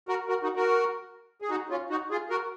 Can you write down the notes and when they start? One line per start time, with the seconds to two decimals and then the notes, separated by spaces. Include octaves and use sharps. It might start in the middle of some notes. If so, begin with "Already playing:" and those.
0.08 F#4 A#4
0.29 F#4 A#4
0.43 D#4 F#4
0.56 F#4 A#4
1.42 G#4
1.50 D#4 F#4
1.69 C#4 F4
1.90 D#4 F#4
2.11 F4 G#4
2.30 F#4 A#4